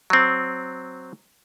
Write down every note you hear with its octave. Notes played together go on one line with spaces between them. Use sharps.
F#3 C4